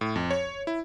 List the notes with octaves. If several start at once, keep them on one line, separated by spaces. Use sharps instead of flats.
A2
F2
C#5
E4